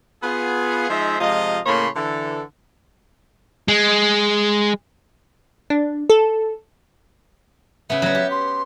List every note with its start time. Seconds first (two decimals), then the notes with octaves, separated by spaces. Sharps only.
0.23 B3 F4 G#4
0.90 F3 G#3 D#4 C5 E5
1.20 C3 F3 G#3 F4 D#5
1.66 A2 C#3 A#3 C#5 B5 C6
1.96 D3 E3 A4
3.68 G#3
5.70 D4
6.10 A4
7.90 C#3 B3 E5
8.02 F#3 B3
8.15 G4
8.31 C6